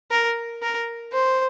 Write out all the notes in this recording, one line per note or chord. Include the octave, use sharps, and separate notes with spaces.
A#4
A#4
C5